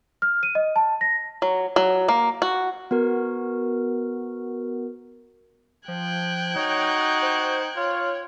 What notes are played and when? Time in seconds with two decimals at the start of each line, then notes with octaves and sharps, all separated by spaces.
0.22 F6
0.43 D#7
0.55 D#5
0.76 A5
1.01 A#6
1.42 F#3
1.76 F#3
2.08 A#3
2.42 F#4
2.91 B3 F#4 A#4
5.88 F3 G5 F#6 G#6
6.56 D#4 F#4 C#5
7.22 C5
7.77 F4 C#5